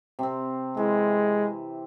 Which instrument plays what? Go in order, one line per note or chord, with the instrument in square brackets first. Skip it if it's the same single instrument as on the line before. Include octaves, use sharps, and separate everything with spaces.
[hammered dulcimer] C3 C4
[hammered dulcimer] E3 [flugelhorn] G#3